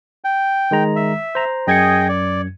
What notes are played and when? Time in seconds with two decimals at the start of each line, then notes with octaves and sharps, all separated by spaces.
0.24 G5
0.71 D#3 G#3 A#5
0.96 E5
1.35 C5 A#5
1.67 F#2 G#4 D#5 G5 G#6 C#7
2.09 D5